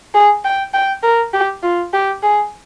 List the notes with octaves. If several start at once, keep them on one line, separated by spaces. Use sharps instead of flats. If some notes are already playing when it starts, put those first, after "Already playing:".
G#4
G5
G5
A#4
G4
F4
G4
G#4